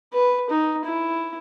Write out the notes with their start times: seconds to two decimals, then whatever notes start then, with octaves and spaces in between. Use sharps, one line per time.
0.14 B4
0.50 D#4
0.85 E4